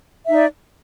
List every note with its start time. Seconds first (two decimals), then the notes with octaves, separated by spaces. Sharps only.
0.24 E5
0.29 D#4
0.34 D5